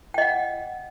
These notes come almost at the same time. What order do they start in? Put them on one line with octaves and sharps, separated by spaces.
G5 D#5 F#5